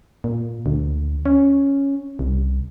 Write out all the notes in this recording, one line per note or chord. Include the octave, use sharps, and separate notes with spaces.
A#2
D2
C#4
C2